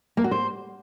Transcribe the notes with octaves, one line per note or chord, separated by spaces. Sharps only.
A#3
F#4
C5